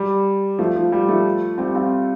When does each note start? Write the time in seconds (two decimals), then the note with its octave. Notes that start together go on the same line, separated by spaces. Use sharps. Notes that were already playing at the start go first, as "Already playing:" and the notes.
Already playing: G3
0.59 F3 A3
0.76 F3
0.92 G3
1.09 F3 A3
1.58 G3 C4
1.75 C4 F4